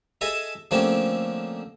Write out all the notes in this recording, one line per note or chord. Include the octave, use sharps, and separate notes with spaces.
G#4 A4 D#5 E5 G#5 A5
D3 F3 A3 A#3 C4 C#4